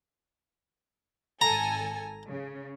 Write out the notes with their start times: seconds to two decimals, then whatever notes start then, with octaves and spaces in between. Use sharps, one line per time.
1.41 G#1 A4 G#5 A#5
2.29 C#3